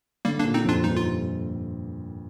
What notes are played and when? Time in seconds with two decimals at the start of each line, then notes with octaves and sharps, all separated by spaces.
0.25 D3 G3 A#3
0.40 A#3 D4
0.44 A#2
0.54 C4 D#4
0.65 F2 D4 F4
0.84 G2 D#4
0.97 F4